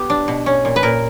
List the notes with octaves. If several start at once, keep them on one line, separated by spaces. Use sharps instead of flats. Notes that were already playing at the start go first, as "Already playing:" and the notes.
Already playing: B3 G4
D4
B2
C#4
A#2
B4
A#2 A#4